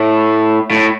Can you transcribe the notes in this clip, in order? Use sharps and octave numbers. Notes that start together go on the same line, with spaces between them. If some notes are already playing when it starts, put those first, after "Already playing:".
Already playing: A2
A2